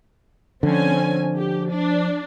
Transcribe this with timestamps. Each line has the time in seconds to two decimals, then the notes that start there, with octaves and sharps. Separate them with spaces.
0.63 D3 F3 C4 C#4 G#5
1.36 G4
1.71 D4